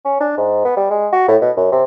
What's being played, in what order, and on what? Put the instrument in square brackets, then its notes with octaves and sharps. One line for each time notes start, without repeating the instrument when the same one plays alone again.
[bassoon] C#4
D4
G#2
B3
G3
G#3
F#4
A2
B2
F#2
C3